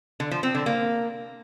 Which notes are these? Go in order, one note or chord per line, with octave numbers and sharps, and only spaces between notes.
D3
F3
C4
D3
A#3